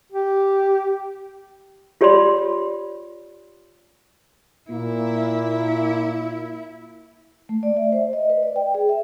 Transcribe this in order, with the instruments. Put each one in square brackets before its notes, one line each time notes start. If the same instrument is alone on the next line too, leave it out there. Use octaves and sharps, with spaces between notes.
[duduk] G4
[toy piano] F4 G4 C#5 D5 B5 C6
[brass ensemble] A#2 A#3 [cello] E4
[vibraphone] A3
D5
E5
C5
D#5
B4
D5
G5
G#4
E5